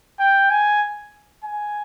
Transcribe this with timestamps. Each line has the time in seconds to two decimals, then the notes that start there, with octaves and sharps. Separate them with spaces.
0.20 G5
0.50 G#5
1.44 G#5